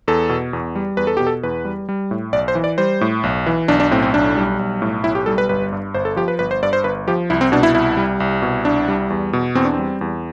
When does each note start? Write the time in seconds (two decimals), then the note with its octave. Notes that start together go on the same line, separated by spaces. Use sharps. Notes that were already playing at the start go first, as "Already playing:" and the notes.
0.08 E2 A4
0.29 B2
0.53 E2
0.75 G3
0.97 E2 B4
1.07 A4
1.17 B2 G4
1.27 A4
1.43 E2 B4
1.65 G3
1.89 G3
2.11 A2
2.33 B1 D5
2.48 C5
2.55 E3
2.64 D5
2.78 G3 C5
3.01 A2
3.23 B1
3.46 E3
3.68 B1 D4
3.80 D4
3.91 A2 C4
4.02 C4
4.14 B1 D4
4.37 G3
4.59 B1
4.82 A2
5.04 B1 E4
5.15 G4
5.26 G3 A4
5.38 B4
5.49 G1 B4
5.72 G2
5.94 G1 C5
6.05 A4
6.16 F3 G4
6.28 B4
6.39 G1 B4
6.51 C5
6.63 G2 D5
6.73 C5
6.84 G1 B4
7.08 F3 G4
7.30 C2 E4
7.41 C4
7.52 B2 D4
7.63 E4
7.75 C2 E4
7.97 G3
8.20 C2
8.42 B2
8.65 C2 D4
8.88 G3
9.10 E2
9.33 B2
9.55 E2 C4
9.65 D4
9.74 C4
9.79 G3
10.01 E2